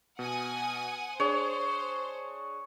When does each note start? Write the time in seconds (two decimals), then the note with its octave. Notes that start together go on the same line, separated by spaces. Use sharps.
0.19 B2 F#5 G#5 D#6
1.20 D4 G#4 C5 C#5